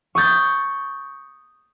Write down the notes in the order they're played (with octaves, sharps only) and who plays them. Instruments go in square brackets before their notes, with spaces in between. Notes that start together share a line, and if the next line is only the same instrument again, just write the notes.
[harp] C#6 D#6 G6 A6